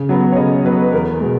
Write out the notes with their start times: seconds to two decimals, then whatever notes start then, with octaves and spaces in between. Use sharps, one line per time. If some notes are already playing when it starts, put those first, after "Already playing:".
Already playing: C#3
0.09 F#3 B3
0.33 C#5
0.36 C#3 D#5
0.64 F#3 B3 B4
0.92 E2 A#4
1.21 B2 G#3